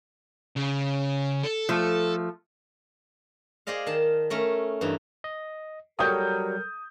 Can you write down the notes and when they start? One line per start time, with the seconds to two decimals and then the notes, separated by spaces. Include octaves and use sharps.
0.56 C#3
1.44 A4
1.69 F3 A3
3.67 G#4 C5 D5 D#5 F5
3.86 D#3 A5
4.30 A3 C#4 A#4
4.81 G2 E3 D#4
5.24 D#5
5.99 F#3 G3 A4 A#4 C#5 G5 D#6 G6